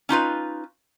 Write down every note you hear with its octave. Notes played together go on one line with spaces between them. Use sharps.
C#4 D#4 F4 B4